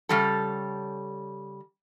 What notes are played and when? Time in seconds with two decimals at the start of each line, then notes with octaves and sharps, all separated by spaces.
0.09 C#3 G3 A4